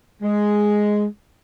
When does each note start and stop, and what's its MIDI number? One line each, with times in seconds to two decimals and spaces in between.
0.22 1.04 56